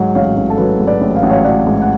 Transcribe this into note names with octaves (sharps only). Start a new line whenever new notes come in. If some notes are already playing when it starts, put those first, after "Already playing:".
Already playing: G#2 F#3 F#5
A1 C#5 F5
A1
A4
F#3 B4
G#2
B4 D5
A1
F5
A1 F#5
C#5 F5
F#3 D5 F#5
G#2
F#5